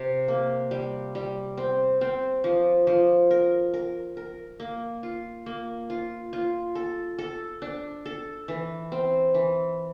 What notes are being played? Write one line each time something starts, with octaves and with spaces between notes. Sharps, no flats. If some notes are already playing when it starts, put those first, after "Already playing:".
Already playing: C3
A#3
G3
G3
C4
C4
F3
F3
A#4
A#4
A#4
A#3
F4
A#3
F4
F4
A4
A4
D4
A4
E3
C4
E3